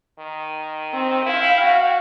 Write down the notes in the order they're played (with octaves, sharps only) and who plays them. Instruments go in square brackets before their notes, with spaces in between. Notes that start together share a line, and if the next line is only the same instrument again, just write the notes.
[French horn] D#3
[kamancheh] C4
[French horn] E4 [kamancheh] F5 G5
[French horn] F#4